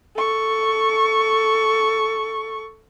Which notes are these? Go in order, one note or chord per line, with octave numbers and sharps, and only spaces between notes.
A4 C#6